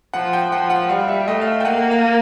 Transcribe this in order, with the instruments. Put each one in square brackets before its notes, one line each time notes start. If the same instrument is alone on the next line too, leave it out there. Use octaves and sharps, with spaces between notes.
[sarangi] F3 [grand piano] F#5
[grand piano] G5
[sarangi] F3 [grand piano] F#5
[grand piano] F#5
[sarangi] G3 [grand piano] F5
[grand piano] E5
[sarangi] A3 [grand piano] D#5
[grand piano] F5
E5
G5
[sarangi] A#3 [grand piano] F#5
[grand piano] F5